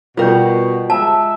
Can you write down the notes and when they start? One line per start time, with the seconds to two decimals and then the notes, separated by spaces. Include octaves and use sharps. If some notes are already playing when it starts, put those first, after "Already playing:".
0.17 B2 G3 F4 A#4 G5 G6
0.90 G#3 E5 A5 A#5